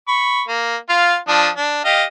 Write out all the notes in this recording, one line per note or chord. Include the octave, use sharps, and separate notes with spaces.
B5 C#6
A#3
F4 F5
F3 D4 D#6
D4
G4 D#5 F5